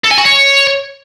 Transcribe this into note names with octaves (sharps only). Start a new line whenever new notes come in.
A4
G#5
F#4
C#5